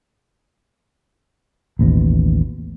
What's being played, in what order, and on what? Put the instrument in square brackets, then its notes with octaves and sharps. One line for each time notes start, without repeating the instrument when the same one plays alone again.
[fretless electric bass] A1 D#2 B2